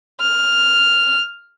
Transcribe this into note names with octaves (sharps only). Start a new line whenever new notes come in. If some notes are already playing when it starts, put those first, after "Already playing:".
F6